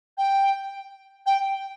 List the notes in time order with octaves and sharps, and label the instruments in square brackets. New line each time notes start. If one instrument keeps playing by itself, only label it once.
[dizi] G5
G5